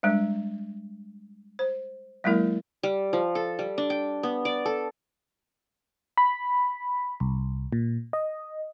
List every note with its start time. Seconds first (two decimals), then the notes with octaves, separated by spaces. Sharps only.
0.03 G3 G#3 D4
1.59 C5
2.24 F#3 G#3 A#3 E4 A#4
2.83 G3
3.13 F3
3.35 A4
3.59 G3
3.78 D4
3.90 G5
4.23 B3
4.45 D5
4.66 A4
6.17 B5
7.20 C2
7.73 A#2
8.13 D#5